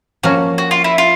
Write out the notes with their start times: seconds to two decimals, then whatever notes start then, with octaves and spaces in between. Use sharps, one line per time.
0.23 F3 A#3 C#4 F#4
0.58 F#4
0.71 F4
0.84 E4
0.98 F4